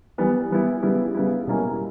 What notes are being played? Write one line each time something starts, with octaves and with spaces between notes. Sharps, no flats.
E3 G3 B3 E4
E3 G3 B3 E4
C#3 G3 B3 E4
C#3 G3 B3 E4
B2 G3 A#3 C#4 E4